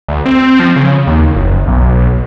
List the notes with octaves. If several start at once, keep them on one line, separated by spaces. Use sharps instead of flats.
D2
C4
F3
C#3
D#2
F#1
B1